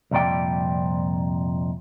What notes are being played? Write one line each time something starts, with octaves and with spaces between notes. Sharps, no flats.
C2 F2 A#2 D5 G5